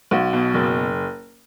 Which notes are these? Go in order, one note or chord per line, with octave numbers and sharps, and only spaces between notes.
B1 F#4
B2
F#1